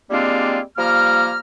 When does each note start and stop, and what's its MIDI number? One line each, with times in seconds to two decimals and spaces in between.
0.11 0.59 55
0.11 0.59 56
0.11 0.59 58
0.11 0.59 60
0.11 0.59 62
0.11 0.59 65
0.78 1.37 53
0.78 1.37 55
0.78 1.37 58
0.78 1.37 82
0.78 1.37 89